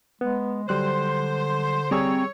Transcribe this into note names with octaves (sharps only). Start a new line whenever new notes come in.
G#3 B3
D3 F#3 G3 C5 F#6
G3 C4 G#4 C#5 A#5 E6